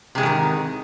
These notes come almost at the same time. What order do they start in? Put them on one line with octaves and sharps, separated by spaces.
C3 G#3 E2 G#2 D#3